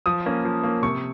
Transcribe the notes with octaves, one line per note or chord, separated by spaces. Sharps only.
F3 D#6
A#3 C#4
F3
A#3 C#4
C3 C#6